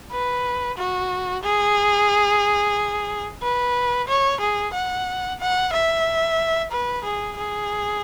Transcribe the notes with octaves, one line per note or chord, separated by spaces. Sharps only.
B4
F#4
G#4
B4
C#5
G#4
F#5
F#5
E5
B4
G#4
G#4